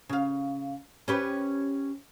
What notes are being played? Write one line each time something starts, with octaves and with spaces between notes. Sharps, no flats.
C#3 F5
C#4 G4 B4